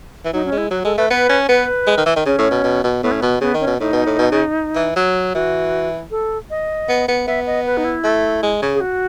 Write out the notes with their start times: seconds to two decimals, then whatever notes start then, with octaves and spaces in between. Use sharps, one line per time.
0.25 E3
0.33 F#3 D#4
0.46 C#4
0.52 G#3
0.58 E4
0.71 F#3 F#4
0.84 G#3 A4
0.97 A3 B4
1.10 B3 B4
1.29 C#4
1.48 B3 B4
1.87 G#3
1.97 D#3
2.06 E3
2.16 D#3
2.26 C#3 C#4
2.38 A2
2.51 B2
2.64 B2
2.84 B2
3.03 A2 B3
3.11 C#4
3.21 B2 B3
3.41 C#3 B3
3.54 D#3
3.61 C#4
3.67 B2
3.79 A2 D#4
3.93 B2
4.06 A2
4.19 B2
4.32 C#3
4.76 E3
4.96 F#3
5.34 E3 F#4
6.11 A4
6.50 D#5
6.89 B3
7.08 B3
7.27 B3 E5
7.47 D#5
7.66 B4
7.77 D#4
7.85 E4
8.04 A3
8.43 G#3
8.62 C#3
8.75 G#4
8.81 F#4